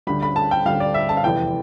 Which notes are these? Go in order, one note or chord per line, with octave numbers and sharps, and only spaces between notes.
D2 D3 G3 B5
B5
A5
G5
D2 D3 G3 F5
D5
E5
A5
F5
F1 E2 C3 E3 G5